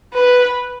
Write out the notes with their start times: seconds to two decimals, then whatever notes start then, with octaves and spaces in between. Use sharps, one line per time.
0.14 B4